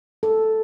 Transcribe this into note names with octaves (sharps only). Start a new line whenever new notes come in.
A4